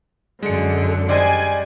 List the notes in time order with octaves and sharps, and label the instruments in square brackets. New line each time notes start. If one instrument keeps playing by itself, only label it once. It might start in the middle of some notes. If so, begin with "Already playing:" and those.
[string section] F#2 D3 [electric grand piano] G#3 C#7
[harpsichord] G3 G#3 C5 [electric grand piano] D5 [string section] G#5